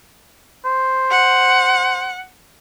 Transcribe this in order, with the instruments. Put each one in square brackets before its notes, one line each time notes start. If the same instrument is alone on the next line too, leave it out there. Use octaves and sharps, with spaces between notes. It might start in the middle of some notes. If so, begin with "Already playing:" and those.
[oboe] C5
[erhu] F#5